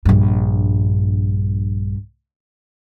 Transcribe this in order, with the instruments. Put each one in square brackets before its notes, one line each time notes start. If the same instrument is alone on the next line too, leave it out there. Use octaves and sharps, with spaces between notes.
[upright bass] A#1 G2